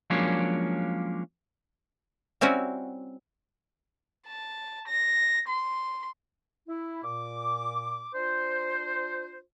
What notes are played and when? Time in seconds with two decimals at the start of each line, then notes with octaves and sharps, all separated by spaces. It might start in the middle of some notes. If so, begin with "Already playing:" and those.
0.10 F3 F#3 G#3 A#3 C#4 D4
2.41 G3 C4 C#4 E4 F#4
4.28 A5
4.88 A#6
5.48 C6
6.67 E4
7.04 A#2 D6
8.13 D4 F4 C5